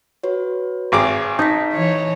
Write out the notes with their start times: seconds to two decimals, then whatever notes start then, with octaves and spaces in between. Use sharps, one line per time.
0.23 F#4 B4 C#5
0.92 G#1 G#4 D6
1.39 D#4 A5 A#6 B6
1.74 E3 C#5